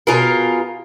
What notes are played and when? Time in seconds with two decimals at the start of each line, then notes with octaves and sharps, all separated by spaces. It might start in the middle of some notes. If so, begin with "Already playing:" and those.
0.07 B2 F4 G#4 A#4